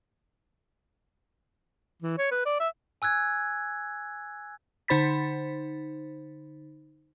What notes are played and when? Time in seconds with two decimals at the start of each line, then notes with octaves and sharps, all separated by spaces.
2.02 E3
2.18 C#5
2.31 B4
2.46 D5
2.60 E5
3.02 G#5 E6 F#6 G#6
4.88 D3 D#4 C5 B5 A6 B6